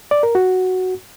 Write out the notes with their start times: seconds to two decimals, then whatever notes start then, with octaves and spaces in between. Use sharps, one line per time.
0.11 D5
0.23 A#4
0.35 F#4